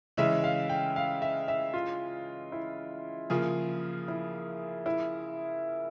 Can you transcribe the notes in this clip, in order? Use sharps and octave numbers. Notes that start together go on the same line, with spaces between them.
C#3 E3 G#3 C#4 E5
F5
G5
F5
E5
E5
F4
E4
C#3 F3 A#3 F4 G#4
E4
E4